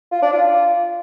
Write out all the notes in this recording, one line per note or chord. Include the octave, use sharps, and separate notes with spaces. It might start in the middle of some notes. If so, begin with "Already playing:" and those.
F4
D4
F4